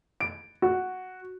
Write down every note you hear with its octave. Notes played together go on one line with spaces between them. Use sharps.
D7
F#4